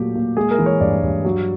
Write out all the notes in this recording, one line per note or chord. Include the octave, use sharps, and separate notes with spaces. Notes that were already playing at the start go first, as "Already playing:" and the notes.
Already playing: A#2 F#3 A3 G4
A#2
G#3 G#4
A#4
E3
C#5
G2 D5
G2
F#3